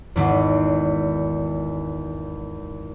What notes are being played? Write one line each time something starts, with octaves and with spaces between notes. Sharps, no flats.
G#1 E2